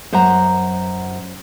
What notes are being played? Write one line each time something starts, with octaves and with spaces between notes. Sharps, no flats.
F#2 C5 E5 F#5 A#5